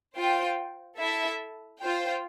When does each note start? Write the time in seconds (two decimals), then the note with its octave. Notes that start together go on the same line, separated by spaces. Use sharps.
0.15 F4 C5 G5
0.98 E4 A4 E5
1.80 F4 C5 G5